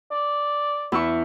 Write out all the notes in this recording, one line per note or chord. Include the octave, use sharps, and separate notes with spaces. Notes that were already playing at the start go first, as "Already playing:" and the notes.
D5
E2 E4 C#6